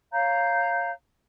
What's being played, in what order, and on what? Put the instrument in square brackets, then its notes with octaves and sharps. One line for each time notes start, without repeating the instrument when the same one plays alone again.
[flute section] C#5 F5 A#5 G6